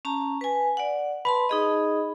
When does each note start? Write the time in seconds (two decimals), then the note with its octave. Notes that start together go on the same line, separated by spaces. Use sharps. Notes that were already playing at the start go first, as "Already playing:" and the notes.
0.05 C#4 A5 A#5
0.41 B4 G#5
0.77 D5 F#5
1.25 B4 A5 B5 C6
1.49 D#4 G#4 D#5